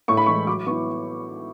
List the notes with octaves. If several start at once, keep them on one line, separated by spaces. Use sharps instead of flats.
A2 C#6
B5
E3 G#3 C#6
F#3 D6
B3 E4 C#6